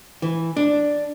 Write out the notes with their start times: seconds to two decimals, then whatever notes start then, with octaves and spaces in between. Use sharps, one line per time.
0.22 E3
0.56 D4